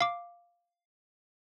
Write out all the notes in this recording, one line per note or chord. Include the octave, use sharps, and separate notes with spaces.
F5 D6